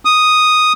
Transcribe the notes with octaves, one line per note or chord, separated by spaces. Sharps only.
D#6